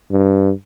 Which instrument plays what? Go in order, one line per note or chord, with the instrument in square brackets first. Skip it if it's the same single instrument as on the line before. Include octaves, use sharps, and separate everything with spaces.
[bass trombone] G2